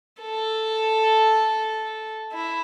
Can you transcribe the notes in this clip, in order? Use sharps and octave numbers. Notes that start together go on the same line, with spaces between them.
A4
E4